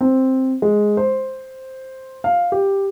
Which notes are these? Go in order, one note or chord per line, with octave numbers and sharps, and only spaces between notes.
C4
G#3
C5
F5
G4